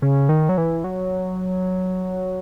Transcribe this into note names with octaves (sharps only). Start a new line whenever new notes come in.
C#3
D#3
F#3
E3
F#3